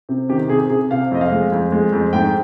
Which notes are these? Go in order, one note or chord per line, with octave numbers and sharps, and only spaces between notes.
C3
D#3 G4
C3 G#4
C3 G#4
C3 F5
F2 D#5
F5
G#3
F2
G#3
F2
G#2 G5